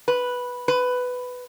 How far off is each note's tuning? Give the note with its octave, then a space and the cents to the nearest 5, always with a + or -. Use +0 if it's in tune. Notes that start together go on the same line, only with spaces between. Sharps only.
B4 -5
B4 +10